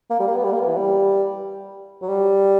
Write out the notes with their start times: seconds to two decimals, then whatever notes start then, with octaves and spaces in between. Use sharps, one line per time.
0.10 A#3
0.20 G3
0.27 A#3
0.36 B3
0.44 G3
0.53 A#3
0.60 B3
0.68 E3
0.77 G3
2.02 F#3
2.09 G3